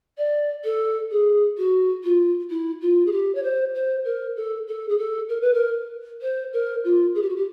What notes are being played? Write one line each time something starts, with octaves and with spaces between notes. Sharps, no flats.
D5
A4
G#4
F#4
F4
E4
F4
G#4
G4
C#5
C5
C5
A#4
A4
A4
G#4
A4
A#4
B4
A#4
C5
A#4
F4
G#4
G4
F#4
G4